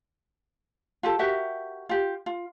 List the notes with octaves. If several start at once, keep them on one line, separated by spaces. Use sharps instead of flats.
F4 G4 A4
F#4 G4 A#4 E5
F4 G4
F4